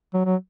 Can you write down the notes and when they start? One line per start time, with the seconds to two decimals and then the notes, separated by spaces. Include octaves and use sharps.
0.14 F#3
0.25 F#3